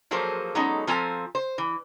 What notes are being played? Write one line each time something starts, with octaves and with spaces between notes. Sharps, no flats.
F3 F#3 A#3 G#4 A4 C5
F#3 G#3 B3 C#4 D#4 A4
F3 C4 F4 A4 G#5 A#5
C5
E3